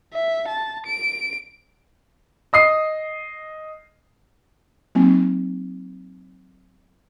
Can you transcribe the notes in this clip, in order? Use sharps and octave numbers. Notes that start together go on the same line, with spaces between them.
E5
A5
D7
D#5 D#6 C7
F#3 A#3 C4 D#4